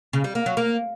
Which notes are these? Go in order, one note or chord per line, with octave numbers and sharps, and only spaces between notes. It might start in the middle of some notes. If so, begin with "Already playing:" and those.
C#3
G3
A#3
F#3
A#3